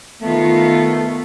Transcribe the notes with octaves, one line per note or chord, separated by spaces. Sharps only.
D#3 A3 B3 F4